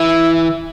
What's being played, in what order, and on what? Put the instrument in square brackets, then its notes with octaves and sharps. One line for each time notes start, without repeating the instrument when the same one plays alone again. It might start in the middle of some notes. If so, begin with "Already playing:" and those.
Already playing: [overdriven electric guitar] E3 [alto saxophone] E4